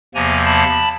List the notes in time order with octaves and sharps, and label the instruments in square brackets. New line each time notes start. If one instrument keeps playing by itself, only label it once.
[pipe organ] E2 C3 F3 A#3 G#5 A#5
A5 B5